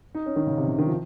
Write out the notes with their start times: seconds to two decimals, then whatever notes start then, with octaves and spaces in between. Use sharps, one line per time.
0.15 D#4
0.26 C#4
0.36 D#3
0.47 C#3
0.57 C3
0.67 C#3
0.79 D#3
0.86 F3